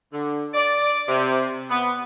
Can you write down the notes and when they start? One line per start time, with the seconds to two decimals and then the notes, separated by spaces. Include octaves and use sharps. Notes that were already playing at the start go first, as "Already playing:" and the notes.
0.13 D3
0.54 D5
1.08 C3
1.70 B3